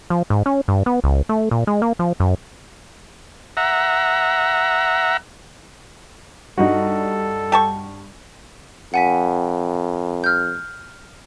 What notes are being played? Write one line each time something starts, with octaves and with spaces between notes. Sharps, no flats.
F3
G#2
C#4
G2
B3
C#2
A3
A#2
G#3
A#3
F3
F#2
E5 F#5 A#5
G2 G3 D#4 F#4 A4
G4 A5 C#6
F2 F#5 G#5 B6
F6 G6